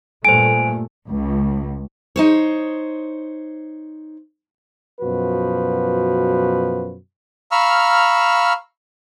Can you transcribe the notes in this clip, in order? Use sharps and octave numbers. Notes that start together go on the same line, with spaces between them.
G2 A#2 A3 C5 G#5 D7
C#2
D#4 C5 C#5
F#2 B2 F3 F#4 B4
F5 A#5 B5 C#6 E6 F6